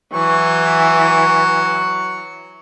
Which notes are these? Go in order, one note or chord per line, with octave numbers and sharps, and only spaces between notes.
E3 F#3 C#6